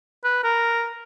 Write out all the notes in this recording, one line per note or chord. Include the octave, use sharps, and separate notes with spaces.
B4
A#4